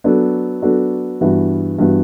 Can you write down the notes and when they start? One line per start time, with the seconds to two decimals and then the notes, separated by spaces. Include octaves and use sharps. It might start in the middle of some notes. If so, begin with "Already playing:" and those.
0.04 F#3 B3 D4 F#4 A4
0.62 F#3 B3 D4 F#4 A4
1.21 G2 E3 B3 F#4
1.79 G2 E3 B3 F#4